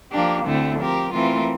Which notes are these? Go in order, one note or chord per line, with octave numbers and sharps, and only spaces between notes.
F3 A#3 D4 G4
D2 D3 A3 C4 E4
F3 C4 G4 A#4
E3 A3 C4 F4 A#4